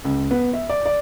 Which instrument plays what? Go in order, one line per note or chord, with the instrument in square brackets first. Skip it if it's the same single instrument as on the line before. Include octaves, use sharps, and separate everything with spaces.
[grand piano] C#2
B3
E5
D5
D5